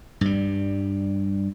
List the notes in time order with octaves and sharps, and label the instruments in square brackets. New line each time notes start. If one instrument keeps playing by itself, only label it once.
[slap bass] G2 G3